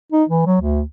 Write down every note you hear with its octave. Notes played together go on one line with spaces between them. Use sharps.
D#4
E3
F#3
D2